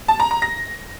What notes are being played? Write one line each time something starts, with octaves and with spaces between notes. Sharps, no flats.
A5
A#5
A#5
A#6